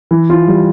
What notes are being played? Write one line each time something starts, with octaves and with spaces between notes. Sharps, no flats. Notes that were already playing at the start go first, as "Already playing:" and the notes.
E3
F4
G3